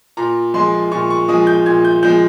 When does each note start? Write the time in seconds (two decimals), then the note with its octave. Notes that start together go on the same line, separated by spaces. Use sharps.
0.17 A#2 A#5
0.54 F3 G#3 C6
0.91 A#2 C#6
1.10 C#6
1.28 F3 G#3 D#6
1.47 G6
1.66 A#2 G#6
1.85 G6
2.03 F3 G#3 G6